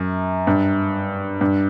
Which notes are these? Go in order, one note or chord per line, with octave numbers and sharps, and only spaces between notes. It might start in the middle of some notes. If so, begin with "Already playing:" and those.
Already playing: F#2
G2
G2